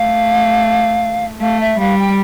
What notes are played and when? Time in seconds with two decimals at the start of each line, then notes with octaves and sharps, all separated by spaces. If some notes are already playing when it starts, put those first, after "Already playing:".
Already playing: A3 F5
1.41 A3 F5
1.60 E5
1.79 G3 F5
1.98 G5